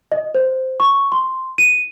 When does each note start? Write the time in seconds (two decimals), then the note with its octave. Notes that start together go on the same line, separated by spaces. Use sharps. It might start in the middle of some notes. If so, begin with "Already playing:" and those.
0.12 D#5
0.35 C5
0.80 C#6
1.12 C6
1.58 D#7